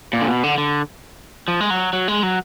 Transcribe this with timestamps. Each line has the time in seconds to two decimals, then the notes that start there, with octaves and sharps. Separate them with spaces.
0.13 A#2
0.21 D3
0.28 B2
0.44 D3
0.58 D3
1.48 F3
1.61 G#3
1.70 F#3
1.93 F#3
2.08 G#3
2.23 F#3